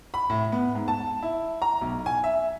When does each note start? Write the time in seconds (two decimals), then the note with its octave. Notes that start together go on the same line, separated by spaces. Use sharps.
0.14 B5
0.30 A2
0.52 B3
0.75 G#2
0.88 A5
1.23 E4
1.62 A#5
1.81 B1
2.06 G#5
2.24 E5